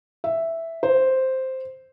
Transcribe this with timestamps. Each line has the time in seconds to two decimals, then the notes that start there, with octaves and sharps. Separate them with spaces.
0.24 E5
0.83 C5